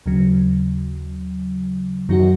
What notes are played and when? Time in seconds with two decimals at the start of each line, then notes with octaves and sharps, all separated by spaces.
0.06 D#2 C#3 F#3
2.09 F#2 D#3 F#3 D#4 F#4